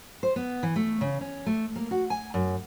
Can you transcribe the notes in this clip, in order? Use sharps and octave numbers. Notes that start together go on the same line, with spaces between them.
C5
B3
E3
A3
C#3
C#4
A3
A#3
F#4
G#5
F#2